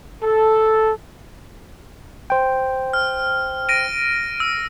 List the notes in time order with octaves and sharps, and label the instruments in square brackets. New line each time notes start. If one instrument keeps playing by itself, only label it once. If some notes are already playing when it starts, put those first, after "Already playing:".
[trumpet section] A4
[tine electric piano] C5 G5
[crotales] F6
A#6 D7 D#7
E6